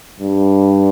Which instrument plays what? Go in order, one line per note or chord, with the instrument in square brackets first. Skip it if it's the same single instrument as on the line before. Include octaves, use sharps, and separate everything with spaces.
[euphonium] G2